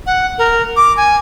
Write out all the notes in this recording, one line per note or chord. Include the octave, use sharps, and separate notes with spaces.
F#5
A#4
D6
G#5